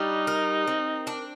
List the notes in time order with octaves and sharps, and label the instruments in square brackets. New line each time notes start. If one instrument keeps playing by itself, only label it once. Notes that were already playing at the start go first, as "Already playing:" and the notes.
Already playing: [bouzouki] G3 D4 [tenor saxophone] D#4
[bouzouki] A#4
C4
D4